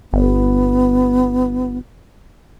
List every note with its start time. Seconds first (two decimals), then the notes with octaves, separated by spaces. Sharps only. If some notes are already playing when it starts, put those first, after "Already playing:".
0.13 G1 B3